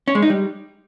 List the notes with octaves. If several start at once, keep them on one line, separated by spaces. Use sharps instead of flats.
C#4
G#3
D#4
G3